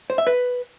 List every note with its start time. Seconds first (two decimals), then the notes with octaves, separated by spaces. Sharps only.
0.10 C5
0.18 E5
0.27 B4